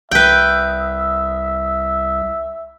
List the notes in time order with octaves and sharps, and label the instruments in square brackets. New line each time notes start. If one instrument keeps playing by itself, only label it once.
[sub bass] C2 [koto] B4 G5 [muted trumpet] E5